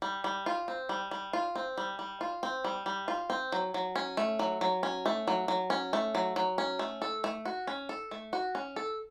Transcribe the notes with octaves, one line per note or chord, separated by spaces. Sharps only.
G3
G3
F4
C4
G3
G3
F4
C4
G3
G3
F4
C4
G3
G3
F4
C4
F#3
F#3
C#4
A3
F#3
F#3
C#4
A3
F#3
F#3
C#4
A3
F#3
F#3
C#4
A3
A4
A3
F#4
C#4
A4
A3
F#4
C#4
A4